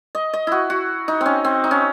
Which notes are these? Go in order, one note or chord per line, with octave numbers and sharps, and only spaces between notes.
D#5
D#5
E4 F#4
F#4
D#4
C4 C#4
C4
D#4
C#4